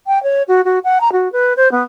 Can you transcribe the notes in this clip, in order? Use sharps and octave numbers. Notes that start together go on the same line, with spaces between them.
G5
C#5
F#4
F#4
F#5
A#5
F#4
B4
C5
B3